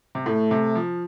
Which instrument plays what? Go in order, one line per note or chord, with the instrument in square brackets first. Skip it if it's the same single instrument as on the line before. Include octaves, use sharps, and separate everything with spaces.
[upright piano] C3
[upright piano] A2 [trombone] A3
[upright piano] C3
F3